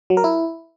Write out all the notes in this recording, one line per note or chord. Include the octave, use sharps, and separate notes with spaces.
F#3
A#4
E4